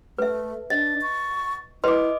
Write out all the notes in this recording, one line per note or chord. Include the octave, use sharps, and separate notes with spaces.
A3 B4 E5
D4 D#5 A6
C#6
E4 B4 D#5 C6 D6